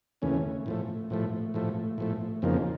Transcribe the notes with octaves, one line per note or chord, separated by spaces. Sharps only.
D#2 C#3 E3 A3 C#4
A2 F3 A3
A2 F3 A3
A2 F3 A3
A2 F3 A3
F2 C#3 F3 A#3 D#4